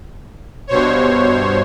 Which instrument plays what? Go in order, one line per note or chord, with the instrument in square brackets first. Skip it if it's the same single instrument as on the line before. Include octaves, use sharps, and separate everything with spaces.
[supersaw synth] G2 B2 C5 C#5